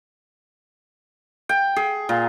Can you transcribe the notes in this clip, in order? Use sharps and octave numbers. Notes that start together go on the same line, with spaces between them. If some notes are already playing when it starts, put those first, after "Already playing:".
G5
G#4
A#2